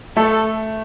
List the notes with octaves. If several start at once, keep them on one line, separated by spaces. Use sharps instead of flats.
A3 A4